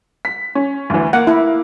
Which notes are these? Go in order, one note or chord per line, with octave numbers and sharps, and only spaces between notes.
B6
C#4
D2 E3
A#3 F#5
E4